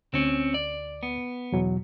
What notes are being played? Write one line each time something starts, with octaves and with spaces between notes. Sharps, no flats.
D2 C4 C#4
D5
B3
E2 B2 F#3